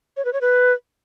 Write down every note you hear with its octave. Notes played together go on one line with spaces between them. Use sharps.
C#5
B4
C#5
B4